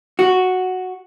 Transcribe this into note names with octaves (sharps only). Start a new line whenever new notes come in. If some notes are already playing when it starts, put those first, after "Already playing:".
F#4